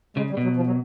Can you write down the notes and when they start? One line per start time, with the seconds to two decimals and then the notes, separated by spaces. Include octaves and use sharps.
0.17 C#3 G#3
0.30 G3
0.37 B2
0.43 F#3
0.56 F3
0.66 F#3